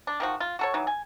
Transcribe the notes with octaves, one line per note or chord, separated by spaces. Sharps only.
D4
D#3 F3 F#4
F4
F#4 A4 C#5
E3 F#3 D#4
G#5